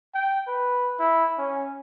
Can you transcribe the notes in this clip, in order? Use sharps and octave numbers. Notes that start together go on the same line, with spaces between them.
G5
B4
E4
C#4